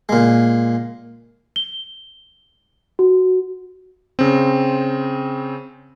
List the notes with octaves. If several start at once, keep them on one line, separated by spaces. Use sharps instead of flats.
A#2 G#3
G7
F#4
C#3 C4